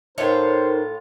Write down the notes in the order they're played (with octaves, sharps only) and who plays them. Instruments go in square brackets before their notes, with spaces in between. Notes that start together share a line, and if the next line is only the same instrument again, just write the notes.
[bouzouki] A2 F4 C#5 [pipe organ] D#4 A#4 [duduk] C5